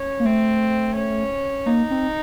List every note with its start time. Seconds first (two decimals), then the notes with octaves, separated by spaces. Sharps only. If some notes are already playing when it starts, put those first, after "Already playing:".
Already playing: C#4
0.20 A#3
0.25 A3 C4
0.95 C#4
1.66 A#3 D#4
1.91 C4